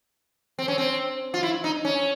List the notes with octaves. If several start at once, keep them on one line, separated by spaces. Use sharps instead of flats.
C4
C#4
C4
F4
E4
D#4
C#4